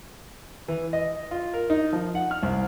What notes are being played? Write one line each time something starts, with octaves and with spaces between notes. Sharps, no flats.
E3
D#5
F4
A#4
D#4
F3
F#5
F6
C2